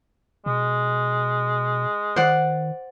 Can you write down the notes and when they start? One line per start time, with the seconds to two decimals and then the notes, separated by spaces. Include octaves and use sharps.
0.46 B2 G#3
2.16 D#3 C5 D5 F#5